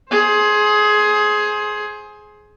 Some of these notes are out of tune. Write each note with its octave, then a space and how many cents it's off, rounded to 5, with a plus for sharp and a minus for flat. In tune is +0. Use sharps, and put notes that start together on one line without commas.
G#4 +15 C5 +20